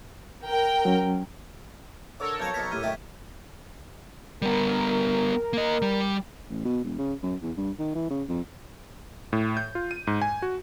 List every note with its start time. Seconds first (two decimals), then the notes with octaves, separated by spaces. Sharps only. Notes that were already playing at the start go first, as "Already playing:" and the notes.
0.46 A#4 G5
0.85 F#3 C#4
2.20 D3 A4 A#4 C#5 E6
2.40 B1 C4 F5 A5 G6 G#6
2.54 B1 B2 C5 B6
2.71 A2 G4 F6 D#7
2.83 F#2 D#3 A3 G5
4.42 G3 B3 A#4
5.53 A#3 D#5
5.82 G3
6.50 A1
6.65 B2
6.84 E1
6.99 C#3
7.23 F#2
7.42 E2
7.57 G2
7.79 D#3
7.95 E3
8.10 C#3
8.29 F2
9.33 A2
9.57 G6
9.75 F4
9.91 D#7
10.07 G#2
10.22 G#5
10.42 F#4